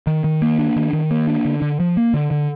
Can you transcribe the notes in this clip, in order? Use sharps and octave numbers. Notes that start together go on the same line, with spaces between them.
D#3
D#3
A#3
D4
D#3
D#3
A#3
D4
D3
D3
F3
A#3
D3
D3